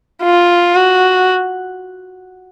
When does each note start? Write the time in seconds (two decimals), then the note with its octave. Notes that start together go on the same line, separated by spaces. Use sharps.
0.23 F4
0.75 F#4